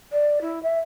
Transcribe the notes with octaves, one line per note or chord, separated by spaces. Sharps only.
D5
E4
E5